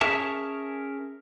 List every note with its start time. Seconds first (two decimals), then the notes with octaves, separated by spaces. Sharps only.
0.01 C#4 G#4 A#4 C#5 E5 A5